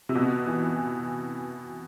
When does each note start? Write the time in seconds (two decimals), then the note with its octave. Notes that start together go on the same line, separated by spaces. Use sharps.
0.09 C3
0.15 B2
0.47 E3